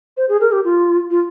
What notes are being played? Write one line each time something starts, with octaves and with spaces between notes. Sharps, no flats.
C5
G#4
A#4
G4
F4
F4